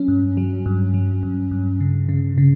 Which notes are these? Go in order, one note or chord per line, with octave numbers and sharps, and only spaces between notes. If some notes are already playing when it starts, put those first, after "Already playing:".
Already playing: F#3 C#4
G2
F#3
G2
F#3
G2
G2
C#3
C#3
C#3